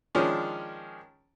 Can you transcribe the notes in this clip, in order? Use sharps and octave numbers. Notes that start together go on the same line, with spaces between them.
D#3 F3 G#3 C#4 D4